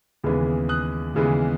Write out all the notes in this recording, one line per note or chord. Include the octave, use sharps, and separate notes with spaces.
D#2 C#3 E3 G#3 B3
D#6 F#6
D#2 C#3 E3 G#3 B3